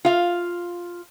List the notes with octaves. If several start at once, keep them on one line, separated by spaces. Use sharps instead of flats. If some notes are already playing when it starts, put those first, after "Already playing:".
F4 F5